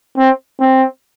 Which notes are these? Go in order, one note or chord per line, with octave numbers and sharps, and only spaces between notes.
C4
C4